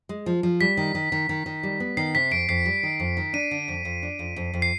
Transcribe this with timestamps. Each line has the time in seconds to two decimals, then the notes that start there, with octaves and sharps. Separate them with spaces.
0.09 G#3
0.26 F3
0.43 F3
0.61 G3 B6
0.77 D#3
0.95 D#3
1.12 D#3
1.29 D#3
1.46 D#3
1.63 G3
1.80 B3
1.97 D#3 C7
2.15 C3 B6
2.31 F2 D7
2.49 F2 C7
2.66 G3
2.83 D#3
2.99 F2
3.17 D#3
3.33 D4 D#7
3.51 D3
3.68 F2
3.85 F2
4.03 D4
4.19 F2
4.36 F2
4.54 F2
4.62 C7